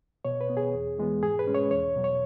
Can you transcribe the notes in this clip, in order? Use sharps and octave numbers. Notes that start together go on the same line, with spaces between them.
B2 C#5
B4
B3
G#4
E2
E3 G#3 B3
G#2 G#4
B4
G#3 C#4
C#5
E2 C#5
B2 F#3
C#5